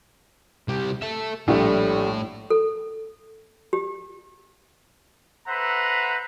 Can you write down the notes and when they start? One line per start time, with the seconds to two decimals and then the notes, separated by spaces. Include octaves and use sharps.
0.68 C2 G4
1.02 A4 E5
1.48 A#1 A2 G3 A3
2.50 A4
3.73 G4
5.47 A4 B4 C5 E5 F#5 A#5